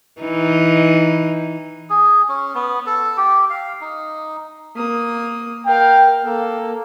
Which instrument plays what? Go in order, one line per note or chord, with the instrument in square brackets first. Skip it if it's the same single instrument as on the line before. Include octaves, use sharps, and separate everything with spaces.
[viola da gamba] E3 D#4
[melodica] G#4
C#4
B3
A4
G4
F5
D#4
[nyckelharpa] A#3 D#6
[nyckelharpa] A#4 F5 [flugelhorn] G5
[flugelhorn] A#3 [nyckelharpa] A4